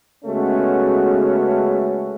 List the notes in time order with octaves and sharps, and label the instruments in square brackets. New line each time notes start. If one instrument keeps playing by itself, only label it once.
[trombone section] C#3 G#3 A3 B3 C#4 F#4